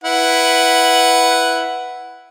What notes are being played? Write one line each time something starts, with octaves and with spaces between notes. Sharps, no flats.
E4 B4 F#5